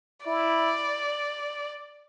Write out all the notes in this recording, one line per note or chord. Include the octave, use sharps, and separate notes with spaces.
E4 D5